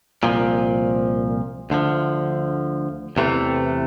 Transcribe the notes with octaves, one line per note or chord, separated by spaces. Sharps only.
C2 A#2 F3
D2 D3 F3
E2 C3 E3 A3